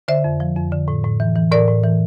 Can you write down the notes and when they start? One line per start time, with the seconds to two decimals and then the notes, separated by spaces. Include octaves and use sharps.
0.08 D3 C5 E5
0.24 F2
0.40 F3
0.56 F2
0.72 D3
0.88 A2
1.04 A2
1.20 E3
1.36 E3
1.52 A2 A#4 D5
1.68 A2
1.83 E3